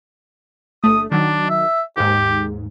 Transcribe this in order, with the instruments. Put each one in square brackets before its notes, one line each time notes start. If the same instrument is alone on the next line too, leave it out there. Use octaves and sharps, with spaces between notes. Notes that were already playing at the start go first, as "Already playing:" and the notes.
[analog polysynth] G1 A3 [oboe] D#6
[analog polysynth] D#3 F#3 [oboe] D4
[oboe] E5
[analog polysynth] D#2 G#2 [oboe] G4